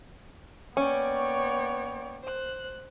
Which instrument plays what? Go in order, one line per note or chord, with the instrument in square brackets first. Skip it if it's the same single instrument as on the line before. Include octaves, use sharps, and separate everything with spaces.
[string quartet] A#3 D5 G5 [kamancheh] B3 C#5 [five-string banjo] C#4
[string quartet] C5 F#6